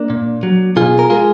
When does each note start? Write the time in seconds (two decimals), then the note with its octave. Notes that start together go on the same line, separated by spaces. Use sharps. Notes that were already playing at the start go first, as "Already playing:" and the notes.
Already playing: A#3 D4
0.10 A#2
0.43 F#3
0.76 B2 F4 G#4
0.99 A#4
1.10 G#3 F4 G#4